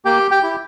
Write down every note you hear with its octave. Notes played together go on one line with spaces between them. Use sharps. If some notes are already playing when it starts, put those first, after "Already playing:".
A#3 G4 G5
G4 G5
E4 G4